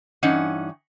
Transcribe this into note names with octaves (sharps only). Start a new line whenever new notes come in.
G2 E3 C#4 D#4 F#5